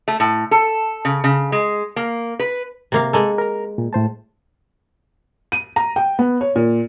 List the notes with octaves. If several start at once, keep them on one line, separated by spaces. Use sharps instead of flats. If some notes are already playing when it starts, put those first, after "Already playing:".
A3
A2
A4
C#3
C#3
G#3
A#3
B4
C3 A#3 F5
G#3 A#3 A4
A#4 A#5
A#2
A2 C5 A5
D#7
A#5
G5
B3
C#5
A#2